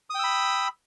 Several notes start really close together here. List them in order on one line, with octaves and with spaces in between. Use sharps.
D#6 G5 E6 B5